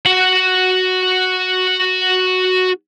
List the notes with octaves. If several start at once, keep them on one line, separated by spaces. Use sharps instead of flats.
F#4 F#5